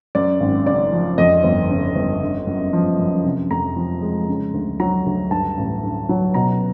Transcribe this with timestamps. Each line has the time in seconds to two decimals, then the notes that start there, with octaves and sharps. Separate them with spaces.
0.15 F#2 D5
0.40 G#1
0.66 C#3 D5
0.92 F3
1.18 F2 D#5
1.43 G1
1.70 C#3
1.95 G1
2.22 D3
2.47 F#2
2.73 F3
2.99 F#2
3.25 C3
3.51 F2 A#5
3.76 F3
4.02 G#3
4.28 C#3
4.54 D2
4.80 F#3 A#5
5.06 D2
5.31 G2 A5
5.57 A1
5.82 D3
6.09 F#3
6.34 B2 A#5